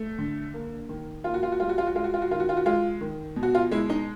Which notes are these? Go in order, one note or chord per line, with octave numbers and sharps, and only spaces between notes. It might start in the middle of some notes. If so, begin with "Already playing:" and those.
Already playing: A3
D3
A#3
D#3
A#3 F4
F#4
F4
F#4
G3 F4
F#4
F4
F#4
G#3 F4
F#4
F4
F#4
D#3 F4
F#4
F4
F#4
G#3 F4
D#3
B2
F#4
F4
G#3 E4
D#4